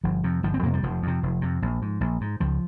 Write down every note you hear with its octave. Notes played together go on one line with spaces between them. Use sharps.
G1 F3
F2 C3
G1 F3
C4
F2 C3 A#3
G3
F1 F3
F2 C3
F1
F2 C3
A#1
G#2
A#1
G#2
C#2 F3